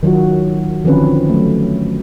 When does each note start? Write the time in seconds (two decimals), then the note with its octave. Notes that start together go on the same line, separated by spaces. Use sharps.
0.03 D#3 F#3 F4 F#4
0.85 D3 D#3 F3 C4 C#4 B4
1.30 F#3 A3